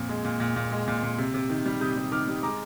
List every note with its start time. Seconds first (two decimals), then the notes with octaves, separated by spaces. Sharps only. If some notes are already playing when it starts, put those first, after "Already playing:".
Already playing: F2 A#2
0.09 G#3
0.25 A#2
0.40 A#2
0.56 A#2
0.72 G#3
0.88 A#2
1.03 A#2
1.18 C3
1.34 C3
1.50 D#3
1.66 G3
1.81 C3 D#6 G6
1.96 G3
2.12 D#3 D6 F6
2.28 G3
2.43 G#3 A#5 D6